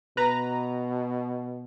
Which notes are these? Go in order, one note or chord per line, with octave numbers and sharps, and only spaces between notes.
B2 B4 A#5